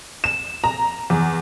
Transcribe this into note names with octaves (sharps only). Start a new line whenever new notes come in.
E7
A#5
E2